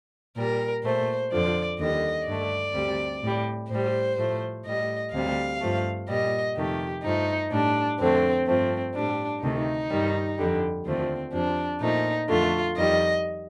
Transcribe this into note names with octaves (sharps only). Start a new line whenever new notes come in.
A#2 G3 A#4
A#2 A3 C5
F2 D3 F3 D5
D#2 D3 G3 D#5
G2 D3 A3 D5
D2 C3 G3
A2 G3
A2 G3 C5
A2 F3 A3
A2 G3 D#5
D2 C3 G3 F5
G2 F3 A3
A#2 G3 D#5
F2 C3 D#3 A3 G4
G2 F3 A3 D#4
A2 G3 D4
F2 D3 A3 C4
G2 F3 A3 C4
A2 G3 D4
D2 C3 D#3 A3 D#4
G2 D#3 G3
F2 D3 G3
D#2 D3 F3 A3 C4
F2 C3 F3 D4
A#2 F3 A3 D#4
F2 D3 A3 F4
F2 D#3 G3 D#5